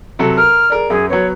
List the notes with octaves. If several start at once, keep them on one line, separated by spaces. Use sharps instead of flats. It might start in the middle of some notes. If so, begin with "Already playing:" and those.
C3 F#3 A4
A#4 F6
G#4 A#4 D5
F#2 G#4
F#3 B3 C#5